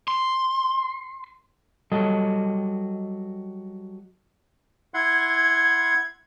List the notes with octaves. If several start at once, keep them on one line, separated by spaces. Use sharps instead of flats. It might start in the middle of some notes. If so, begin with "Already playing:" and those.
C6
F#3 G3 A4 D#5
E4 F#5 C6 G#6